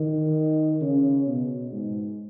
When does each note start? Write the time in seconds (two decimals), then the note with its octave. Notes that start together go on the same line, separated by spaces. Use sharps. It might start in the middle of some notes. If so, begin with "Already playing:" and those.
Already playing: D#3
0.82 C#3
1.27 B2
1.72 G#2